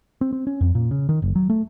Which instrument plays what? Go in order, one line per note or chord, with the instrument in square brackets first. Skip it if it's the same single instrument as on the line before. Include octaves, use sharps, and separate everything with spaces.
[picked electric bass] C4
C4
C#4
F2
A#2
C#3
D#3
F#1
F#3
A3